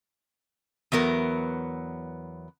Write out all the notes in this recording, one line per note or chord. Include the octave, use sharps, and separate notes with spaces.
E2 F#3 B3 A#4